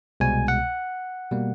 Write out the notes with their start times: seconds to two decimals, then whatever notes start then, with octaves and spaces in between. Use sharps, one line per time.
0.20 C2 B2 G#3 G#5
0.48 F#5
1.32 B2 G3 A#3